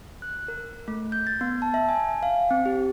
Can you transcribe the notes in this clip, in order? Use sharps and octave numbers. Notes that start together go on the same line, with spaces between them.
F#6
A#4
A3
G6
A6
B3
A5
E5
G#5
F5
C4
G4